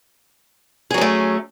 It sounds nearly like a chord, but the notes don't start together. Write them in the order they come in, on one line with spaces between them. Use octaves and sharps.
G#4 F#3 C#4 A3